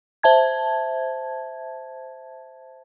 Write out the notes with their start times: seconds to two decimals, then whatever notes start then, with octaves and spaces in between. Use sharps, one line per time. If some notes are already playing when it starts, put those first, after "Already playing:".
0.23 C5 E5 A5 G#6